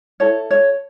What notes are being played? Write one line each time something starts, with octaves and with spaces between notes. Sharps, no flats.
E4 A4 C#5
C#5